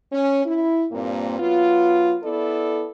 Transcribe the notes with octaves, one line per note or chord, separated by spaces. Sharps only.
C#4
E4
G2 A#2 A#3 C4
F#3 B3 F4
B3 E4 A4 D5